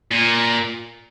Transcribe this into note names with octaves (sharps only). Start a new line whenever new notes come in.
A#2